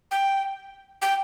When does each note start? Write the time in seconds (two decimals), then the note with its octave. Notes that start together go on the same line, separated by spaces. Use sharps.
0.11 G5
1.02 G5